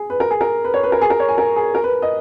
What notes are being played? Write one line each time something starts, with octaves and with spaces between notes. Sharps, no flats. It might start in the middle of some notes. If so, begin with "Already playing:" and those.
Already playing: G#4
B4
A#4
G#4
A#4
B4
C#5
B4
A#4
G#4
A#4
C#5
G#5
A#4
G#4
A#4
B4
D#5